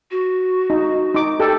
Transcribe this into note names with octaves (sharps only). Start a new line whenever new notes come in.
F#4
D#4
D#4 D6
G4 A4